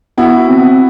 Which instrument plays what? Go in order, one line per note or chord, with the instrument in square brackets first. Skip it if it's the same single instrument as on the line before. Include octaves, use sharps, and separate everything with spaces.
[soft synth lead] B3 [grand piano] E4 F#4
[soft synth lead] C4